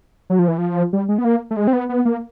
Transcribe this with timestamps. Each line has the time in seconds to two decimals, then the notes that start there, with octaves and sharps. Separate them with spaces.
0.30 F#3
0.39 F3
0.48 E3
0.58 F3
0.93 G3
1.09 G#3
1.18 B3
1.25 A#3
1.51 A3
1.57 G#3
1.67 C4
1.73 B3
1.89 B3
2.05 A#3